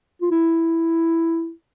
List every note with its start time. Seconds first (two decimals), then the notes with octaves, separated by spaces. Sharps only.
0.22 F4
0.31 E4